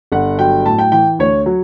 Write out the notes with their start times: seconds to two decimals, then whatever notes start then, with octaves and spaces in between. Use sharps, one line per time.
0.12 G1 F#5
0.38 F#3 G5
0.66 A2 A5
0.79 G5
0.92 E3 G5
1.19 D2 C#5
1.46 F#3